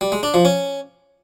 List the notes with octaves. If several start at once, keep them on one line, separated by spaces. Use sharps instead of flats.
G3
G#3
D4
F3
C#4